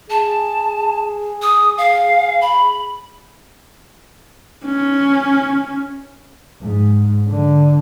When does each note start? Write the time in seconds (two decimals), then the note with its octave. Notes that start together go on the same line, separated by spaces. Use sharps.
0.10 G#4 A5
1.42 D#6
1.78 F5
2.41 B5
4.65 C#4
6.62 G#2
7.29 D3